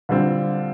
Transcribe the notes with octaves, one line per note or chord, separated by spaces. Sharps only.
D3 G3 C4 F4